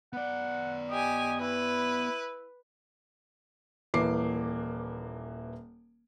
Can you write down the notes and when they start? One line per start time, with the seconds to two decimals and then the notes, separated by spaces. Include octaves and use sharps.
0.13 B3 D5 F#5
0.90 G4 D#5 G#5
1.41 E4 B4
3.94 D#1 E3 A#3 D6 C7